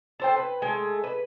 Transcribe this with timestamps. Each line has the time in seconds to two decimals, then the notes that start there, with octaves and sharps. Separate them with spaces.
0.20 A4 C5 G5
0.37 B4
0.62 G#3 A3
1.04 B4